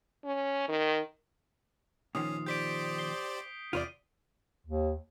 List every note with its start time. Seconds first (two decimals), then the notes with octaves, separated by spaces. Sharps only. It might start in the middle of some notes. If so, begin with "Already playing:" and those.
0.25 C#4
0.69 D#3
2.15 A#2 D#3 F3 C#4 D#6 C7
2.46 G4 C5 D5 G6 B6 D7
2.98 C7 G7
3.73 E2 C3 F4 C5 D5 D#7
4.67 D#2